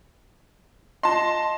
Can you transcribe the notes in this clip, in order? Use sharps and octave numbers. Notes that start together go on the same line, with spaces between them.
F4 D#5 A5 C6